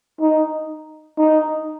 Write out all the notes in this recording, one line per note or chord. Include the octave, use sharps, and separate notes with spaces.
D#4
D#4